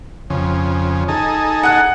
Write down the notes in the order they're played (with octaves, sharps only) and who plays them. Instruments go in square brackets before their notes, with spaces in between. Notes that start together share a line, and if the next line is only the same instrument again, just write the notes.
[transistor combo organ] F2 C#3
D#4 G#4 A4
[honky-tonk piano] F#5 F#6